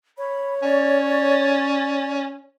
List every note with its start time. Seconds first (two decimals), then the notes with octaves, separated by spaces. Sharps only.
0.18 C#5 B5
0.62 C#4 D5